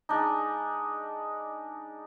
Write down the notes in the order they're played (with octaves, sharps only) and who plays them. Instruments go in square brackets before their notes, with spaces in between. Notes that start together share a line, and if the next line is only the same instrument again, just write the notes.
[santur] G#3 D4 D#4